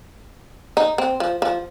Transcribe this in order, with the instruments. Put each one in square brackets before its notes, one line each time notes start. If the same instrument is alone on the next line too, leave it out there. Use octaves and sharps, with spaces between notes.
[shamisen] D#4
C4
F3
F3